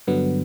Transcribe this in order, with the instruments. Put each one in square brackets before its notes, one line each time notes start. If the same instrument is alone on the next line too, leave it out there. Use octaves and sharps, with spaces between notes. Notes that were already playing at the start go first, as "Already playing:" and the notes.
[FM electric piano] G2 D3 F#3 B3